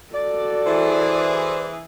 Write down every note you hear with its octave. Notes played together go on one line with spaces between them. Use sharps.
F#4 A4 D5
E3 E4 G#4 C5